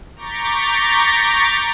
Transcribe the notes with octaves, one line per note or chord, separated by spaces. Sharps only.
A#5 C#6 D6 G6 A6 B6